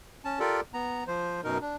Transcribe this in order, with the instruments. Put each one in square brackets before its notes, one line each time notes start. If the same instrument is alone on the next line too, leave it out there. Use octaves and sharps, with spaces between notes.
[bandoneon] C#4 A5
F4 G4 A4 A#4 D5
B3 A#5
F3 C5
F#2 B2 D#4 A#4
D4